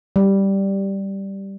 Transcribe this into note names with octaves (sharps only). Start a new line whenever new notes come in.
G3